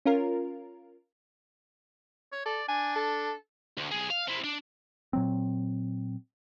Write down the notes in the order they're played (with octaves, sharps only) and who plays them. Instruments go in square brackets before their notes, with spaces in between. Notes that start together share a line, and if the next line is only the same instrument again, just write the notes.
[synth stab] C#4 F4 A#4
[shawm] C#5
[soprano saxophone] A4 [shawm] D5
[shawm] D4 [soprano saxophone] G#5
[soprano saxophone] A4
[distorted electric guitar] D2
B1 G#4
F5
C4 E4
D4
[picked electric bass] A#2 F#3 C4